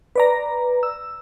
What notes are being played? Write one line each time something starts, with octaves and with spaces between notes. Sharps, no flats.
B4 D5 A#5
E6